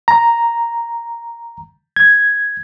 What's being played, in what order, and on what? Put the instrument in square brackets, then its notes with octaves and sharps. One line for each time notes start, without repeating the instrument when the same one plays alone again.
[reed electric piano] A#5
G#6